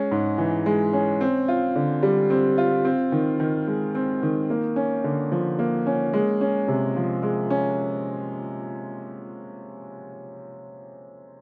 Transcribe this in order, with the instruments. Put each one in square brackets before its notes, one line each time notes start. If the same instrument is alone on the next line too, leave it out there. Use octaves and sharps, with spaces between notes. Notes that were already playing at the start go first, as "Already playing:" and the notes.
Already playing: [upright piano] G#3 C#4
G#2
E3
G#3
C#4
C4
F4
D3
G3
C4
F4
C4
D#3
D#3
G#3
C4
D#3
A#3
C#4
D3
F3
A#3
C#4
G#3
C#4
C3
F3
G#3
C#4